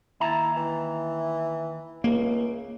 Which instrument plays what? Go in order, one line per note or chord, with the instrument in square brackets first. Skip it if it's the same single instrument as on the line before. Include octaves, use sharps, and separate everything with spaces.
[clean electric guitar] D#2 A5 A#5 [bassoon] E4
[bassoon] E3
[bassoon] C#2 [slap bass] A#3